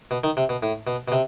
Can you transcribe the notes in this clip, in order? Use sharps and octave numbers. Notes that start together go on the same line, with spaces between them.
B2
D#3
C3
B2
A2
B2
B2
C3